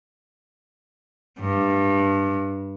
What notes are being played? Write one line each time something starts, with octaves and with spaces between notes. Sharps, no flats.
G2